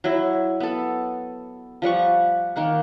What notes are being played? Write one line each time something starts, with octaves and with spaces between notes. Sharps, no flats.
F#3 E4
B3 A4
F3 G3 F#5 C#6
D#3 A#3 F#5